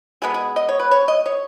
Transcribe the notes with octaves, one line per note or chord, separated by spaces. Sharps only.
B2 G#3 B3 G#4
G#4
D#5
C#5
B4
C#5
D#5
C#5